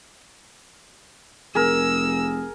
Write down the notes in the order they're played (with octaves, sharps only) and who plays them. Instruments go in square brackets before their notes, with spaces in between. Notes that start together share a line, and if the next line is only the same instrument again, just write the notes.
[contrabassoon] F1 [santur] G#4 A#4 [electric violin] E6